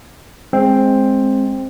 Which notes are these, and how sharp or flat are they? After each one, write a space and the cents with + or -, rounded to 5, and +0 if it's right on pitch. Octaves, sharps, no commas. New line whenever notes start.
G#3 +0 C4 +10